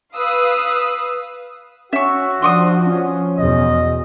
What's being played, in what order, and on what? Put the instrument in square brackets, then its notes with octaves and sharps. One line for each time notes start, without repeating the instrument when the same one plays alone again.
[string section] B4 F5 D#6 E6
[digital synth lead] C#4 [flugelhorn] F#4 [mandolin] E5 C#6
[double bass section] F3 [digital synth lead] D4 [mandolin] C6 C#6 D#6
[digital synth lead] C#4
[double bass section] E2 B2 [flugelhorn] D#5